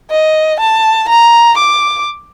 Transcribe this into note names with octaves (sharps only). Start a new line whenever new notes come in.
D#5
A5
A#5
D6